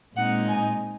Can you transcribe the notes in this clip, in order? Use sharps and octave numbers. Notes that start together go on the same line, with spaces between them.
A#2 G#3 C4 D#4 F#5
G#5